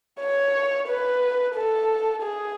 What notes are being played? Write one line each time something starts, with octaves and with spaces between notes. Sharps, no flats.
C#5
B4
A4
G#4